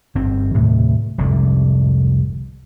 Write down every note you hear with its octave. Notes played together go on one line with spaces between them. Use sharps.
G1 C4
D#2 A2 C3
F1 C2 G#2 D3